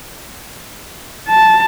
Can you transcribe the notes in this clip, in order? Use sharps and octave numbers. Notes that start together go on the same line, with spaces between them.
A5